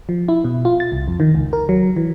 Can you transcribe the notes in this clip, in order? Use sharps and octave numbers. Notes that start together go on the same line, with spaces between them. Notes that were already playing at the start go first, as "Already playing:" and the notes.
F3
E4
B2
F4
A6
C2
F2
D#3
C#2
A#4
F#3
E3